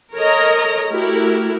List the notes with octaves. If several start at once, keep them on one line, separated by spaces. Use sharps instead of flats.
A4 A#4 C#5 D#5 A#5
A3 E4 F#4 G4 A#4